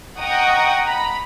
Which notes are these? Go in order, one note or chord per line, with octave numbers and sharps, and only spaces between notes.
D#5 F#5 G5 A#5 C#6 D#6
A#5 B5